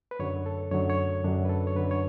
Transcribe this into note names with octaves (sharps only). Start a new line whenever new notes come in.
B4
F#2 D3 F#3 C#5
A4
F#2 D3 F#3 C#5
C#5
F#2 D3 F#3 D4
B4
A4
C#5
F#2 D3 F#3 B4
C#5